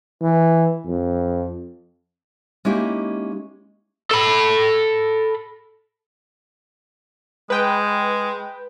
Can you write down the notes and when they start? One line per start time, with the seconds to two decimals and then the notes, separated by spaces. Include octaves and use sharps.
0.22 E3
0.86 F2
2.65 G#3 A#3 C#4 D#4 E4 G4
4.11 A4 B5
7.50 G#3 B4 G5